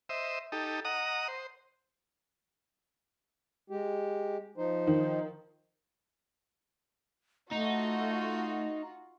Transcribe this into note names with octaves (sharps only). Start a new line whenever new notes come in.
C5 D#5 E5
D#4 G4 A4
D#5 F#5 A#5 D#6
C5
G#3 G4
F3 D#4 C5
D#3
A3 D#4 F4 F#4